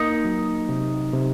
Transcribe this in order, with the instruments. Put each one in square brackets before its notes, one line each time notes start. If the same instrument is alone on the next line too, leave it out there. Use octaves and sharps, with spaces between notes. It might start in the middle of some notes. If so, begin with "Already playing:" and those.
Already playing: [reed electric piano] A#3 [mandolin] D#4
[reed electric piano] F#3
C3
C3